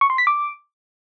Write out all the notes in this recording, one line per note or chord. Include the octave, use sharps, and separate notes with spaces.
C#6
C6
B6
D6